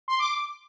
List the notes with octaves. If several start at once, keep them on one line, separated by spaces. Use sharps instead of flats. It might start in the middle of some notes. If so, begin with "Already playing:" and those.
C6
D6